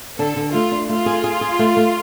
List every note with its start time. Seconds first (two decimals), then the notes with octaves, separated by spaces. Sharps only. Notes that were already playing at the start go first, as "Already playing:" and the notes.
0.19 D3 A4
0.36 D3
0.53 A3 F4
0.72 D4
0.89 A3 F4
1.06 G#4
1.24 G#4
1.41 G#4
1.59 A3
1.77 A3